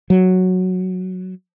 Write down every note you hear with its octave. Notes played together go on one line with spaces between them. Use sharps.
F#3